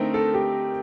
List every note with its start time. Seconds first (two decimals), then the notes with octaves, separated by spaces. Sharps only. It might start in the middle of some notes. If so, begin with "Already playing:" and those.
Already playing: D3 A3 C4 D#4 A#4
0.14 A4
0.34 G4